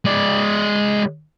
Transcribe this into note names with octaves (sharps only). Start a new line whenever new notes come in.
G#3 D5